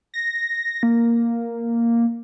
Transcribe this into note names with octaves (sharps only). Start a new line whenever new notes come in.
A#6
A#3